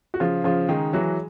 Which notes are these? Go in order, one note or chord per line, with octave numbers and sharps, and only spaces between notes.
F#4
C#3 F3 F4
C#3 F3 F4
D#3 G#3 D#4
E3 F#3 F#4